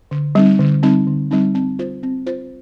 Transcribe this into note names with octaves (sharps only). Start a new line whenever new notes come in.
D3
G3 C4 D#4
D3
G3 C4 D#4
D3
G3 C4 D#4
C4
F4 C5
C4
F4 C5